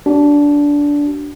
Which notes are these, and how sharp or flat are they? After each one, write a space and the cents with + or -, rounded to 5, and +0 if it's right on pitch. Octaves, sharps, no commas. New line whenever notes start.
D4 -15 F#4 +30